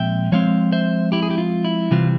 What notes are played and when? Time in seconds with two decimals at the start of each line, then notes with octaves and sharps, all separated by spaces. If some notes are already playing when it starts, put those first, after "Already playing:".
Already playing: A#2 F3 G#3 C4 E5 G5
0.32 F3 G#3 C4 C#5 F5
0.72 C5 E5
1.12 E4 G4
1.22 G#4
1.30 G4
1.38 F4
1.65 E4
1.91 C3 E3 G3 C4 F4